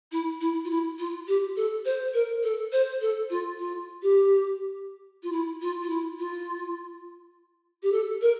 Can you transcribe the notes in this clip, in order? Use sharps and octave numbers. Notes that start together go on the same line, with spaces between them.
E4
E4
F4
E4
F4
G4
A4
C5
A#4
A4
C5
A4
F4
F4
G4
F4
E4
F4
F4
E4
F4
G4
A4
A#4